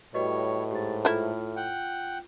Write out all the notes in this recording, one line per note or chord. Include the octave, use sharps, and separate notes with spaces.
A2 G3 F#4 B4 C#5 D#5
G#2 G4 A6
A3 E4 F4 F6
F#5 G5